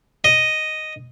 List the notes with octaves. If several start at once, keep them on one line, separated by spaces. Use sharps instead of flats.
D#5